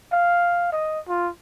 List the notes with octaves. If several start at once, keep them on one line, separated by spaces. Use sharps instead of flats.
F5
D#5
F4